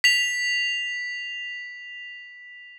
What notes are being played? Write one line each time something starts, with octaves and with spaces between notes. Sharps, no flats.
B6 F7